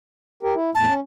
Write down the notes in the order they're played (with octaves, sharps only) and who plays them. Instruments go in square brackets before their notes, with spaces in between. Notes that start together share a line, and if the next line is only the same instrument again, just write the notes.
[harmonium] G4 A#4
E4
[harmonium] E2 A2 [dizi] A5
[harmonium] C#4